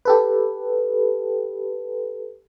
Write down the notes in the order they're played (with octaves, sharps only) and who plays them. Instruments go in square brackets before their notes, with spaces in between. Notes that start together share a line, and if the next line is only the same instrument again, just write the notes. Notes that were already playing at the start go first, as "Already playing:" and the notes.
[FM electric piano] G4 A4 B4